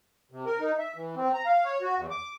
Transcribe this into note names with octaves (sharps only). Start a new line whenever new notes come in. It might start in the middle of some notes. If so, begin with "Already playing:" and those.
C3
A#4
D#4
E5
E3
C4
A#5
F5
C#5
F#4
E2
D6